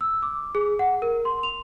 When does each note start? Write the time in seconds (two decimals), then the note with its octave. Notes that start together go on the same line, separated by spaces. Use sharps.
0.01 E6
0.22 D6
0.55 G#4
0.79 F#5
1.02 A#4
1.25 C6
1.43 F7